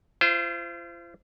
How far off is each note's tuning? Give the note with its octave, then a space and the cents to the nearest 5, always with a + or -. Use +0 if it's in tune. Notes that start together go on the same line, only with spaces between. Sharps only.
F4 -40 C5 -15